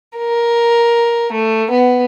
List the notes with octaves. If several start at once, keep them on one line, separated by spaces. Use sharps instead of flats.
A#4
A3
B3